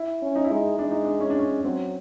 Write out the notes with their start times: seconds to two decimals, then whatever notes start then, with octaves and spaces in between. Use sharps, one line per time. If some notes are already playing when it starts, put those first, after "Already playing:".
Already playing: E4
0.22 C#4
0.36 D#4
0.44 E4
0.51 G#3 D#4
0.78 G#3 D4
0.91 D#4
1.04 D4
1.21 C#4
1.30 D4
1.39 C#4
1.64 F#3 C4